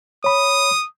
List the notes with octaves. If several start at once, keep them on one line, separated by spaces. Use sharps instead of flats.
C#5 B5 D#6